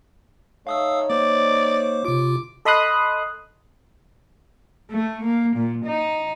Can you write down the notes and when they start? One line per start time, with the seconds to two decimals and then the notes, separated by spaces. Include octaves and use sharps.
0.67 A3 D#4 C#5 F5 D#6 E6
1.10 A#3 C5 D5 D6
2.05 C3 F4 D6
2.65 A4 D#5 B5 C6 D#6 F#6
4.91 A3
5.24 A#3
5.56 A#2
5.86 D#4